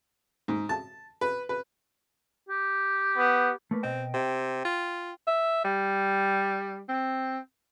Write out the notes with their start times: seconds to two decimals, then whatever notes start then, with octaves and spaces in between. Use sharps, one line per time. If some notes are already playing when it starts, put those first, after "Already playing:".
0.48 G#2
0.69 A5
1.21 B4
1.49 B4
2.49 G4
3.17 B3
3.71 A3 A#3 B4
3.83 B2 C4 D#5 G5
4.14 C3 G5
4.65 F4
5.27 E5
5.64 G3
6.89 C4